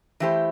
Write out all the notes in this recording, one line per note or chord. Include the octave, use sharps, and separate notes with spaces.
E3 A3 E4 G4 C5